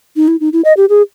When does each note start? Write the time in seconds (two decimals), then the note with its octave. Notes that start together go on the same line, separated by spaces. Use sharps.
0.16 D#4
0.28 E4
0.41 D#4
0.53 E4
0.65 D#5
0.77 G4
0.89 G#4